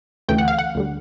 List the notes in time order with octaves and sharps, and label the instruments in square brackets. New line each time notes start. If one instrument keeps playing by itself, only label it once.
[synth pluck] D2 C#3 E3 A3 G5
F#5
F5
F#5
D2 D3 G3